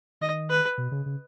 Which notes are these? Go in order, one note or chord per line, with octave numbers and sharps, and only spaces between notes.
D#3 D#5
B4
B2
C#3
C#3